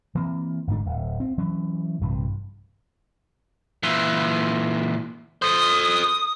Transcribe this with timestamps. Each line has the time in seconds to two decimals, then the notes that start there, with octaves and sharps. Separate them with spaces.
0.15 E3 A#3 C4
0.67 G1 G#2 A3 D4
0.86 D1
1.20 C4
1.38 E3 F#3 C#4
2.02 A#1 G2 C3 E3
3.83 A#2 E3
5.42 A4 C5 D#6